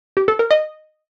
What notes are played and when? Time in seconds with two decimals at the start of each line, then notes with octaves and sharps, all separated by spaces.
0.17 G4
0.28 A4
0.39 A#4
0.51 D#5